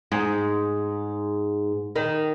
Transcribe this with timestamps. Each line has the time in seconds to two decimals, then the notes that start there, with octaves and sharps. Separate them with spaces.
0.12 G#2
1.96 D#3